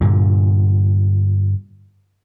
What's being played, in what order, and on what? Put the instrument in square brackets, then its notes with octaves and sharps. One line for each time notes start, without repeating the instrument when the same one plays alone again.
[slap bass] G2 A#2 D3